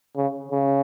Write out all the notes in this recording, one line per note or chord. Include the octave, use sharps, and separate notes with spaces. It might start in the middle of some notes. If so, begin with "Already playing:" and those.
C#3
C#3